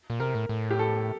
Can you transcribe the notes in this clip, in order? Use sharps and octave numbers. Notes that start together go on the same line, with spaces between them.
A#2
C3 A#4
A2
A2
G4
A4